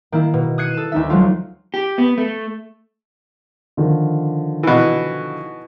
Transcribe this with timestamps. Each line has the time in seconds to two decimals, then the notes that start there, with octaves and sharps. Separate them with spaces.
0.12 D#3 A#3 E4
0.34 B2
0.58 D#6 F#6 G#6 C7 C#7 D#7
0.74 A4 E7
0.92 D2 D#4 E5
1.10 F3 F#3 G#3 A3 F4
1.74 G4
1.98 B3
2.18 A3
3.77 D3 D#3 F3
4.63 B2 E3